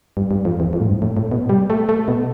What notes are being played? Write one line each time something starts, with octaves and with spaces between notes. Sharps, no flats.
G2
G2
F2
E2
F2
A2
G2
A2
A2
B2
G3
A3
A3
B2